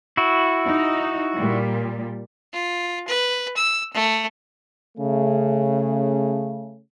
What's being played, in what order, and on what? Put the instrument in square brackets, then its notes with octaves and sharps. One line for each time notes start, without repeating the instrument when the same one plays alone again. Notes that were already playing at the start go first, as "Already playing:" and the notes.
[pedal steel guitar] E4 F#4
[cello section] D#4
A#2 G3
[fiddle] F4
B4
E6
A3
[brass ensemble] C#3 A3